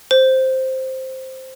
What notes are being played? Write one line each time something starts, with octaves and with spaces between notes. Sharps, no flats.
C5